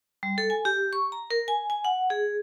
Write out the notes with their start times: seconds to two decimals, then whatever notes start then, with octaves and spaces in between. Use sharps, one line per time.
0.23 G3
0.38 A4
0.50 G#5
0.65 G4
0.93 C#6
1.12 A#5
1.31 A#4
1.48 G#5
1.70 G#5
1.85 F#5
2.10 G#4